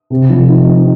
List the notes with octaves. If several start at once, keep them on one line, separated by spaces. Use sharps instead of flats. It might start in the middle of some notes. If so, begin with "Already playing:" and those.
C3
F3
D#4
D#4